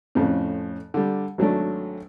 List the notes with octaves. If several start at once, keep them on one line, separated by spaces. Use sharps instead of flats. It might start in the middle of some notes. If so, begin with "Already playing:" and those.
F2 A2 C#3
D3 G3
G#1 F#3 A3 D4